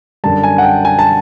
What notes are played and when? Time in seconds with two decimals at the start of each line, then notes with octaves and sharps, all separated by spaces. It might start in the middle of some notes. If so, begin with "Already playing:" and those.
0.24 F#2 D3 G3 A5
0.43 G#5
0.58 F#5
0.64 G5
0.85 G#5
0.99 A5